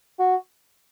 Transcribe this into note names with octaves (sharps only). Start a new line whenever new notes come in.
F#4